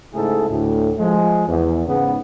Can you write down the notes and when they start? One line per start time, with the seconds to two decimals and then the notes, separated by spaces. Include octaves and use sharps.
0.14 G#2 C#3 A3 E4 G#4 A4
0.49 D2 A2
0.99 F3 G#3
1.48 E2
1.87 G#2 C#3 B3